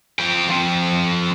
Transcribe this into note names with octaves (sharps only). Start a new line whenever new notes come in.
F3 G5
F3 C4